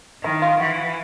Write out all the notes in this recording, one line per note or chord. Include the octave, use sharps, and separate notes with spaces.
D#3 E4
F4
E3 F#4